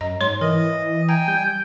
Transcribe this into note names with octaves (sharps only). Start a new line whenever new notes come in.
F#2 D#5 A#5
G#2 C#5 C6
E3 A#4 D#5
G5 G#5 A#5
G3 G6